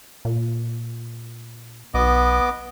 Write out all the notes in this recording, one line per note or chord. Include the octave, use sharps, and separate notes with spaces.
A#2
B1 B3 D#5 D6